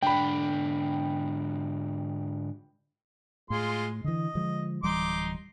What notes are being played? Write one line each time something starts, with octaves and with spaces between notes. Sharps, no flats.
G#2 D3 D4 G5 B5
A2 G#3 F4 C6
D3 E3 D#5
D3 F3 G#3
D1 E3 G3 D#4 C6 D6